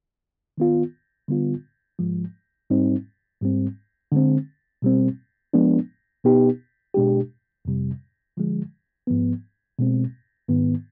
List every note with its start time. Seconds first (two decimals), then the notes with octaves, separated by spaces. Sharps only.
0.58 D#3 B3 F4
1.28 D3 G3 B3 F4
1.99 G#2 F3 G#3
2.70 G#2 G3 C4 D#4
3.41 G#2 G3 C4
4.12 D3 G#3 C4
4.82 B2 G3 C4
5.53 F3 G#3 B3 D4
6.24 B2 B3 D#4 G4
6.94 B2 G#3 D4 G4
7.65 F2 C3 G3
8.37 D3 F3 G#3
9.07 G#2 F3 B3
9.79 B2 G#3 C4
10.49 G#2 D#3 B3